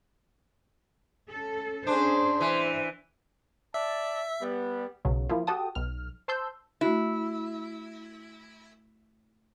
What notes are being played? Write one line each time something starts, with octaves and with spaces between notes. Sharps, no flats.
C#4 A4
C#4 D4 G#4 C5 C6
E3 C5 E5
D5 E5 A5
G3 B3
B1 C#3 F#3
E3 F3 A#3 E4 F4
F#4 G4 A4 G5 A5 D#6
B1 F6
C5 A5 C6 E6 G6
A3 E4 F#4